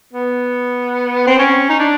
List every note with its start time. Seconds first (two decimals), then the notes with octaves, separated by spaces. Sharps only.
0.13 B3
1.27 C4
1.39 C#4
1.69 D#4
1.80 D4